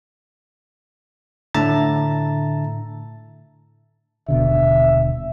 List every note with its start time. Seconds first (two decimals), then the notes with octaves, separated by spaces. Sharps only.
1.54 A2 D3 E5 A5 A#5 A6
4.28 D#1 B2 D3 E5